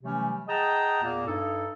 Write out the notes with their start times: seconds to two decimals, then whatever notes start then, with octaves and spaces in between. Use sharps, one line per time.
0.03 C3 E3 F#3 G3 A3 C#4
0.48 G#4 D#5 F#5 G5 A5 A#5
1.02 E2 A#2 A#3
1.27 G2 D#4 A4